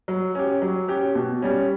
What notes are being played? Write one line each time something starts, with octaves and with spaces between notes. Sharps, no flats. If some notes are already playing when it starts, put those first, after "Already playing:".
F#3
C#4 G4
F#3
C#4 G4
B2
G3 C#4